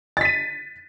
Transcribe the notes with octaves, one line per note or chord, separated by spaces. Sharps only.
A6 B6 D#7